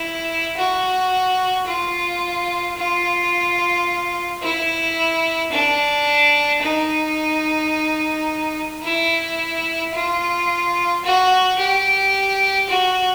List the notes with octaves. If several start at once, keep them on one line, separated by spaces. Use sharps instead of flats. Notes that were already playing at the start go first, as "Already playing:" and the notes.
Already playing: E4
F#4
F4
F4
E4
D4
D#4
E4
F4
F#4
G4
F#4